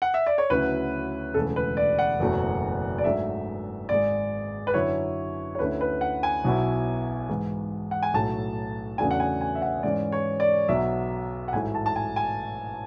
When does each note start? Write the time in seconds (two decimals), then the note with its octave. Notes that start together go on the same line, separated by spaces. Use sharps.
0.02 F#5
0.14 E5
0.26 D5
0.38 C#5
0.50 D2 C#3 F#3 C#4 E4 B4
1.34 E1 D2 C#3 E3 G#3 A4
1.56 B4
1.77 D5
1.99 F#5
2.20 F#1 E2 B2 F#3 A3
2.98 D5
3.04 G#2 F#3 A3 D4 E5
3.89 G#1 G#2 G#3 D5
4.67 B4
4.74 F#2 D3 F#3 C#4 E4 C#5
5.55 C#5
5.59 D2 D3 A3 C#4 E4 B4
5.81 B4
6.01 F#5
6.23 G#5
6.44 B1 B2 F#3 B3 E4
7.29 G#2 E3 G#3
7.91 F#5
8.03 G#5
8.13 B1 A2 F#3 A3 A5
8.98 E2 C#3 F#3 A3 D4 G#5
9.11 F#5
9.20 G#5
9.41 G#5
9.55 E5
9.62 F#5
9.83 G#2 E3 G#3 C#4 D5
10.12 C#5
10.40 D5
10.68 B1 B2 F#3 E5
11.48 F#5
11.53 A1 G#2 F#3 A3 E4 G#5
11.75 A5
11.86 A5
11.96 G#5
12.16 G#5